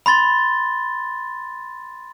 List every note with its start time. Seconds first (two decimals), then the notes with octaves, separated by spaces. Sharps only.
0.06 B5 C6 A6 G7